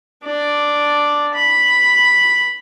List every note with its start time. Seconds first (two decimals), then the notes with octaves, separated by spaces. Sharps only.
0.25 D4 D5
1.35 B5